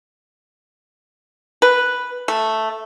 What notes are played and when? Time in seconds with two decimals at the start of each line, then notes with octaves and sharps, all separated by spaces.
1.62 B4
2.28 A3